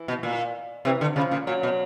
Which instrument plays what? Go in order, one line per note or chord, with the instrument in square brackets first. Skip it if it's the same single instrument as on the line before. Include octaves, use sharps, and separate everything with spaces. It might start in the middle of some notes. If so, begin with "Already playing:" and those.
Already playing: [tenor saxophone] E3
[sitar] B2
A#2
[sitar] C3 [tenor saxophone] E3
[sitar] D3
[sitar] C#3 [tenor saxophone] F3
[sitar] A#2
[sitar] A#2 [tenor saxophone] F#3
[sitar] B2